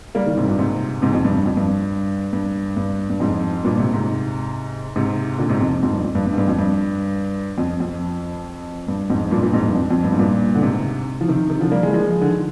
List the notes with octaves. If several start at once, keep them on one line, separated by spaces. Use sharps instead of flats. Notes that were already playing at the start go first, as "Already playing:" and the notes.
G3 A#3
D#3 G3
G#2 C3
G2 A#2
G#2 C3
G#2 C3
F2
G2
G2
F2
G2
G2
G2
G2
F2 G#2
G2 A#2
G#2 C3
G#2 C3
G#2 C3
A#2 D3
G#2 C3
F2
F2 G#2
G2
F2
G2
G2
G#2
G2
F2
G2
F2
F2
G2
F2 G#2
G2 A#2
G2 A#2
F2 G#2
G2
F2
F2
G2
G#2
G2 A#2
D3
G#2 C3
F3
C3 D#3
C3 D#3
D3 F3
G3 A#3
F3 G#3
G3
F3 G#3
D3
D#3